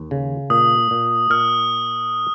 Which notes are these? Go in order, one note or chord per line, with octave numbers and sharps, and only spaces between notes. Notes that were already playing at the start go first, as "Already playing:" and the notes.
Already playing: D#2
C#3
A#2 D#6
A#2
A#2 F6